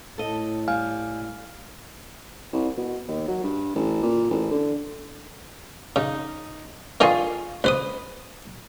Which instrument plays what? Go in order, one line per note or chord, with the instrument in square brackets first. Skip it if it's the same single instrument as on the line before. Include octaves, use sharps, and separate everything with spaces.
[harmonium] A2 [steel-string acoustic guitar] A4 D#5
[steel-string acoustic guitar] G3 [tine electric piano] F5 G#5 F6
[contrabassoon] C2
B2
D#2
F#3
G2
A1
A#2
A1
D3
[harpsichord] C#3 [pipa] D#4
[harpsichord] D3 D#3 D#4 [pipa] F4 G#4 C#6
[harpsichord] C#2 C5 D#6 [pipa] B4